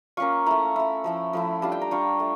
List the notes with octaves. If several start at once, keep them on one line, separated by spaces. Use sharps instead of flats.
A#3 C#4 F4 C#6
A3 E4 A#5
A3 E4
F3 A3 E4
F3 A3 E4
G3 D4 F4 A5
G5
A#5
G3 D4 F4 C#6
A3